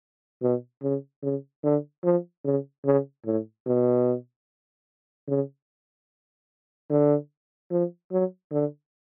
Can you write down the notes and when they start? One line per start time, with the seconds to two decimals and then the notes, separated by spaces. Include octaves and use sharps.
0.43 B2
0.83 C#3
1.23 C#3
1.64 D3
2.04 F3
2.45 C#3
2.85 C#3
3.26 A2
3.67 B2
5.28 C#3
6.90 D3
7.71 F3
8.12 F#3
8.52 D3